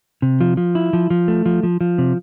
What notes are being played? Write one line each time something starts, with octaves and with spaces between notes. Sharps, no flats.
C3
F3
F3
E4
F3
F3
A3
F3
F3
F3
C3